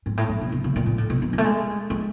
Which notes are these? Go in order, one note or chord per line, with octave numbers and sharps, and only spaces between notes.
G#2
A2
A2
B2
C3
C#3
A#2
A#2
A2
B2
D#3
G3
A3
G#3
G#3